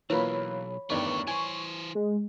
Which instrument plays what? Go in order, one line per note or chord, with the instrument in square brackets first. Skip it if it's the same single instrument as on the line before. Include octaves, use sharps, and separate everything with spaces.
[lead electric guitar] B1 [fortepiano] E3 A#3 F4 [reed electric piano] C#5 B5
[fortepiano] E2 G2 D#3 [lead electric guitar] A3 D5 [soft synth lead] C#6
[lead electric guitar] E3 C5 [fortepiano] G#5
[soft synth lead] G#3